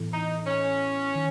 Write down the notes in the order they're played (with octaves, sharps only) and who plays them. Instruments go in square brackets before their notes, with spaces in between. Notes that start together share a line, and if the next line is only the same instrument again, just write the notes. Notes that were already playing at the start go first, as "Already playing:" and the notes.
Already playing: [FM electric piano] A2 E3 B3 E4 A4
[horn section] D#4
C#4
[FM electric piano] D#3